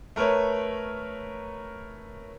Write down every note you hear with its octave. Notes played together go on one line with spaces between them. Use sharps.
A3 A#4 B4 C#5